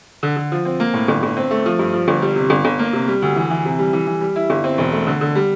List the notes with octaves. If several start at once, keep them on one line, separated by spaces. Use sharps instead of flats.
D3
D3
F3
C4
A#3
A2
G1
G1
C4
A3
F3
G2
F3
G1
G3
C3
G1
G1
A#3
C3
G3
D2
E3
E3
C3
G3
E3
E3
G3
E4
G1
C4
E1
A3
D3
D3
G3